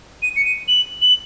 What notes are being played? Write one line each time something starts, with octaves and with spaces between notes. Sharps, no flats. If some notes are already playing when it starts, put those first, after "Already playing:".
D#7
C#7
D#7
F#7
F#7